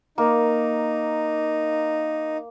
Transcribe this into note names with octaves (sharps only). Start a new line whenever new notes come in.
A#3 D#4